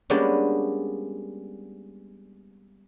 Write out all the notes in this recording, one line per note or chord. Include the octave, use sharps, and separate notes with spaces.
G3 G#3 A#3 B3 C#4 D4